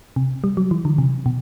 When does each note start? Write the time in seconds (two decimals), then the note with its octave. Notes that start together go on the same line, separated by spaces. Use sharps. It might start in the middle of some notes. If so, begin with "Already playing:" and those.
0.16 C3
0.44 G3
0.57 F#3
0.71 E3
0.85 D3
0.98 C3
1.26 B2